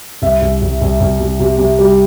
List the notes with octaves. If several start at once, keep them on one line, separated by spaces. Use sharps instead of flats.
C2 E5
C2
C2
C2
C2
C3
C3
C3
G3